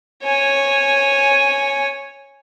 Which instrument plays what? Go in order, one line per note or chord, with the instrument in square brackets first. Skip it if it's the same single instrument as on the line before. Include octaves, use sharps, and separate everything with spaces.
[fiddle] C#5 G#5